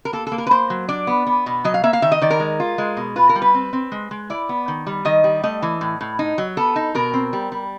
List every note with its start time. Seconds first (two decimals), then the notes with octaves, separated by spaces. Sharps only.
0.05 A#4
0.13 A#3 A4
0.27 A4
0.32 A#3
0.38 A#4
0.47 B4
0.51 A#3 C5
0.70 F#3
0.89 D4 D5
1.07 B3
1.27 B3
1.46 B2
1.65 F#3 D#5
1.74 F5
1.84 A#3 E5
1.93 F5
2.02 D#3 E5
2.12 D#5
2.22 D#3 D5
2.30 A#4
2.40 G#3
2.60 F4
2.78 G#3
2.97 B2
3.16 F4 B4
3.29 A#4
3.36 G3
3.42 B4
3.54 C4
3.73 C4
3.92 G#3
4.11 G#3
4.30 E4 D5
4.49 B3
4.68 D#3
4.87 G3
5.05 D#3 D#5
5.24 G3
5.43 A3 D#5
5.62 E3
5.81 A2
6.01 A2
6.19 D#4
6.38 F#3
6.57 B3 A4
6.76 D#4
6.95 B2 A#4
7.14 C4
7.33 G3
7.52 G3